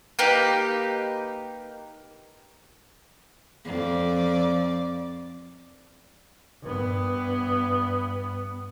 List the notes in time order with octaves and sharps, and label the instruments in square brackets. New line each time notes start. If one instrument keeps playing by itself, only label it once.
[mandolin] A#3 D#4 G4 B4
[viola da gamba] F2 D5
[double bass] G2 B3